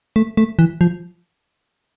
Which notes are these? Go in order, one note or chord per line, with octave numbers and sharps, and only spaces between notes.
A3
A3
E3
F3